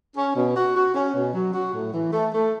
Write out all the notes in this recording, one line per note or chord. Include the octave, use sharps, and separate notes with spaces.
C#4
B2
F#4
F#4
C#4
B2
F#3
F#4
A2
E3
A3
A3